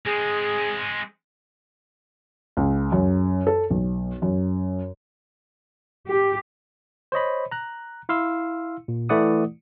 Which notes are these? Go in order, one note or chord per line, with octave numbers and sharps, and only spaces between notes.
G#3 C4 G#4
C#2
F#2
A4
B1
F#2
G4
C5 C#5 D#5 B5
A#5 F#6
E4 F5 C6 E6
A#2
E3 A3 E4 D5 F#5 D#6